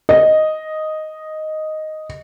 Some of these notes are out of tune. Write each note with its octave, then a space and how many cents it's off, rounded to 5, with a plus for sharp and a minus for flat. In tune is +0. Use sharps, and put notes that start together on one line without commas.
D#5 +0